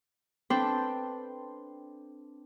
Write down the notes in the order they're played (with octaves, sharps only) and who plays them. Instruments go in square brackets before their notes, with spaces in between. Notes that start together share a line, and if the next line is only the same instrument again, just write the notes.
[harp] C4 D4 A4 B4 C5 G5